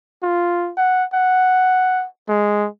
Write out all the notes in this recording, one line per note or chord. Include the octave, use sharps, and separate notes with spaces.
F4
F#5
F#5
G#3